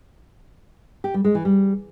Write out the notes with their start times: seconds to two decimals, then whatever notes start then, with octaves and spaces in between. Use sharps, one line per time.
1.04 G4
1.14 G3
1.25 G#3
1.35 E3
1.45 G3